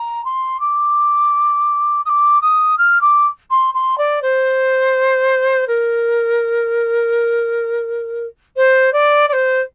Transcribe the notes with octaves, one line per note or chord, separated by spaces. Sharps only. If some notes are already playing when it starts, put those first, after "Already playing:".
Already playing: A#5
C6
D6
D#6
D6
D#6
F6
D6
C6
C6
D5
C5
A#4
C5
D5
D5
C5